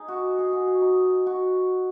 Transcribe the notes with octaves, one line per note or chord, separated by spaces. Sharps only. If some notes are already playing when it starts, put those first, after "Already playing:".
Already playing: D#4 G#4
F#4
G#4
F#4
F#4
D#4
F#4